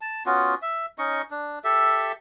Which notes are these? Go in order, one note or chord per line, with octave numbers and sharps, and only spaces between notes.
A5
B3 C#4 F4 F#4
E5
C#4 D#4 D#5 C#6
D4
G4 A4 E5